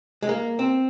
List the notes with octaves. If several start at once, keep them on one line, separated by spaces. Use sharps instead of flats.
G#3
A#3
C4